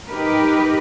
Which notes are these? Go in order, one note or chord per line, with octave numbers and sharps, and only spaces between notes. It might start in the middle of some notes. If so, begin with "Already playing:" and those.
D#4 G4 A#4 B4